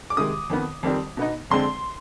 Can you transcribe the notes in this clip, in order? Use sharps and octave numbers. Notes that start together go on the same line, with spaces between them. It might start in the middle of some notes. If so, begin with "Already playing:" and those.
D6
C3 D#3 G#3 D#6
F2 D#3 B3
F2 D#3 G3 C4
B2 B3 D#4
F2 D3 G#3 C4 C6